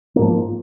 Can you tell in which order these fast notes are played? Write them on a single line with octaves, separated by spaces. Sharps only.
A#3 G#2 F3